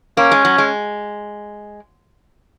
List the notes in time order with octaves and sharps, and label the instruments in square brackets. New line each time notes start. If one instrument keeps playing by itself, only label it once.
[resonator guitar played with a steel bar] A#3 [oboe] C#4
[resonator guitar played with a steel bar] G#3
F#3
G#3